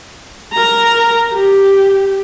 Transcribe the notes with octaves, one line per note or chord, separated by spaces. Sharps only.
A#4 A#5
G4